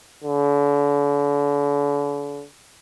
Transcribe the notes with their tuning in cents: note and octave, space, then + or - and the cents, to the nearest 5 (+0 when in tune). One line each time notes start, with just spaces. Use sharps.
D3 -40